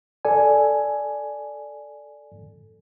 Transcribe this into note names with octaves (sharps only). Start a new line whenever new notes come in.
A4 D5 G#5